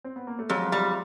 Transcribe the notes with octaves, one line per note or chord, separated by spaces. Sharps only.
C4
B3
A#3
A3
F2 F#3 G#3
G3